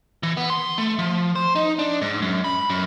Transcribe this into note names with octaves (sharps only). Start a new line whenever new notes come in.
E3
B3
C6
A3
F3
C5
D#4
D4
G#2
F#2
B5
F#2